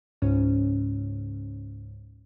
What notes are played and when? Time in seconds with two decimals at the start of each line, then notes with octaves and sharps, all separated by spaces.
0.22 C#2 G#2 C#4